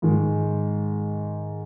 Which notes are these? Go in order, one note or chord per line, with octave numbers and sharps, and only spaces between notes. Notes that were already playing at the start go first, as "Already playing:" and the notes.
G#2 D#3 G#3